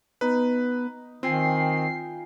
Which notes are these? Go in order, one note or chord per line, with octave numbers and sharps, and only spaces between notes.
B3 D#4 B4
D#3 C4 F4 G5 G#5 C7